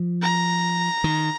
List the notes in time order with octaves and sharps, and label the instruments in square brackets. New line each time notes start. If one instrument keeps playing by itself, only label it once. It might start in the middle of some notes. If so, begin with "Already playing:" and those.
Already playing: [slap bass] F3
[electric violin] A#5
[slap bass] D#3